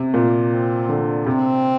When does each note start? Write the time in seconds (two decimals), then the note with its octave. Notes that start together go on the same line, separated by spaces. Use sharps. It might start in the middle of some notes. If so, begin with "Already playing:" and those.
Already playing: C3
0.14 A#2 A#3
0.52 C4
0.89 D3
1.26 C3 C4